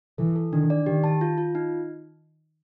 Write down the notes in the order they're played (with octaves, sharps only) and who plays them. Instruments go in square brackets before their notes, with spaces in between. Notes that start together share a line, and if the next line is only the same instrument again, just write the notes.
[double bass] E3 [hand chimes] A4
[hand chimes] A4
[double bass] D#3 [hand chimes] D4
[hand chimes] D5
[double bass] D#3 [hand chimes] G4
[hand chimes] A5
F4
F4
D#4